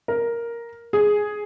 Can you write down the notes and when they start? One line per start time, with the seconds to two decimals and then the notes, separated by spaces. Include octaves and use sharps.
0.08 A#4
0.93 G#4